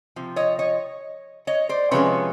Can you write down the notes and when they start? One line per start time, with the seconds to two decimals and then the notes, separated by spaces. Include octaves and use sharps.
0.16 C3 F3
0.36 C#5 D#5
0.59 C#5 D#5
1.47 C#5 D#5
1.69 C5 D5
1.91 C3 F3 G#3 C#4 B4 C#5